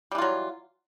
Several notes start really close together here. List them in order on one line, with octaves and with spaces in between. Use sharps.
G3 E3 F4 F#3